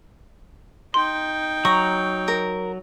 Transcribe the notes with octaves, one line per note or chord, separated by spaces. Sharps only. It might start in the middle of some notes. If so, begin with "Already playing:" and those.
D#4 G5 C6
F#3 A#5 C#6
A#4